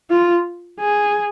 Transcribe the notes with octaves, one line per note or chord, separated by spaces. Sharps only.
F4
G#4